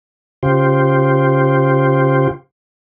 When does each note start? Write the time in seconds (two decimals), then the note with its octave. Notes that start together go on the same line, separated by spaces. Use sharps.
0.43 C#3 F4 G4 C5